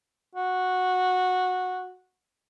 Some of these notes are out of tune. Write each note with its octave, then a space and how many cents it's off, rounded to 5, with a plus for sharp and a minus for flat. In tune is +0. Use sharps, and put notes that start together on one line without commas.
F#4 -10